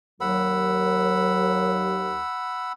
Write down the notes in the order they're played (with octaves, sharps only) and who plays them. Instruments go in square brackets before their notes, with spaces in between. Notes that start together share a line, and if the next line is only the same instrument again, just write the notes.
[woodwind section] D#2 F#3 [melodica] F#5 B5 E6